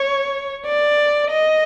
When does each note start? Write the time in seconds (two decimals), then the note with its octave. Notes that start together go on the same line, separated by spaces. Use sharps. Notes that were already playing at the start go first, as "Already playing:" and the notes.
Already playing: C#5
0.65 D5
1.30 D#5